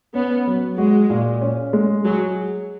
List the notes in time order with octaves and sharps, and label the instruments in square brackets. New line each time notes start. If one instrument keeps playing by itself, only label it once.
[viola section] B3 [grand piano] C#4
[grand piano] F#3
[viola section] G#3 [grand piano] F#4
[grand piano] A#2
C#4
G#3
[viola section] F#3 [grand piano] G#4